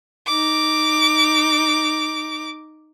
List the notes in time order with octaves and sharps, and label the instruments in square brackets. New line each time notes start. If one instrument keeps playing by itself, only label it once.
[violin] D#4 D6